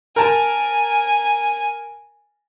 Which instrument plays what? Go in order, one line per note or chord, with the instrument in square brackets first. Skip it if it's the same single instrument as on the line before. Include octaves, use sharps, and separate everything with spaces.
[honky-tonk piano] A#4 A5 [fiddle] G#5